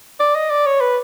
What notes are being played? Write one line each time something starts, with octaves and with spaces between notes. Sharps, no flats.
D5
D#5
D5
C#5
B4